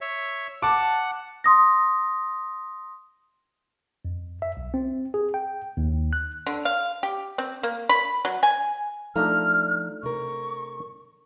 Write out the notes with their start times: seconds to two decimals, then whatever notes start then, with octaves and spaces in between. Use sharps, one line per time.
0.01 C#5 E5
0.62 F#5 A5 D6
1.44 C6 D#6 A#6
4.05 F2
4.42 E5
4.57 B1
4.74 C4
5.14 G#4
5.34 G5
5.77 D#2
6.13 F#6
6.47 D3
6.65 F5
7.03 G4
7.38 C4
7.63 A#3
7.89 B5
8.25 F#3
8.43 G#5
9.16 F3 A3 D4 D#4 A4 A#5 F6
10.03 C3 A#4 C#6